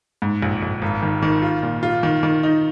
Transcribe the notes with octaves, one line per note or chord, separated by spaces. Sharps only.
G#2
A#1
A#1
G#1
D#3
D#3
F4
A#2
F4
D#3
D#3
D#4